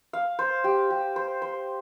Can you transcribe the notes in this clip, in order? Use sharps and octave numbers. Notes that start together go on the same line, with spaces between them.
F5
C5
G4
G4
C5
C5